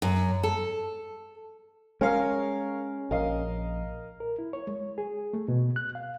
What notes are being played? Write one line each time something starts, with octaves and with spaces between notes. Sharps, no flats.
F#2
A4
G#3 C#4 A#4 C#5 F5
A#1 A#4 D#5 F5
A#4
E4
C#5
G#3
G#4
A3
B2
F#6
F5